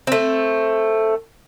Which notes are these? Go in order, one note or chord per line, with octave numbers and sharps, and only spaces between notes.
A3 C4